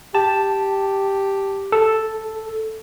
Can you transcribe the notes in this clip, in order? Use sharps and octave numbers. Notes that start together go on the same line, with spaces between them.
G4 A5
A4